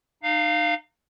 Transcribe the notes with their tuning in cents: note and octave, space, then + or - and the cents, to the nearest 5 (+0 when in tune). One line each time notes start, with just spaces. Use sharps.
D#4 -30 F5 +0